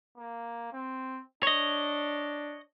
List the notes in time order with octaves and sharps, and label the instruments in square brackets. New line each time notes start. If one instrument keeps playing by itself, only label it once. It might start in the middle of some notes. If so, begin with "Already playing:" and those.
[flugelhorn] A#3
C4
[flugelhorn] D4 [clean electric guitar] C#5 D#5